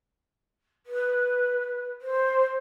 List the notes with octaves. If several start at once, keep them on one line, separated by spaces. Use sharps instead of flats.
B4
C5